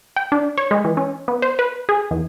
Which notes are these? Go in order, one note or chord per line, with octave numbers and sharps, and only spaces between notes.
G5
D4
C#5
G#3
E3
C#4
B3
C5
B4
G#4
E2